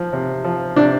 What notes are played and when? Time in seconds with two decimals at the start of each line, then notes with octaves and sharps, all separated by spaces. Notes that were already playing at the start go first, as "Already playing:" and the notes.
Already playing: F3
0.13 C3
0.44 F3
0.76 C3 D4